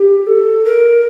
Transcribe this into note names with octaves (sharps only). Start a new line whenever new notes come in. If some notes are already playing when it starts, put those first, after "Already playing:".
Already playing: G4
A4
A#4